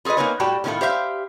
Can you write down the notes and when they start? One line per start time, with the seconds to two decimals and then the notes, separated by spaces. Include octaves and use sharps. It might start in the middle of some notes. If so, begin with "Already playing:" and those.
0.05 F4 G#4 A4 B4 D#5
0.17 A#3 C4 D#4 B4 C#5 G#5
0.40 A2 G3 F#4 G4 G5 A5
0.64 A2 D#3 C#4 E4 F4 A4
0.81 G4 C5 E5 F5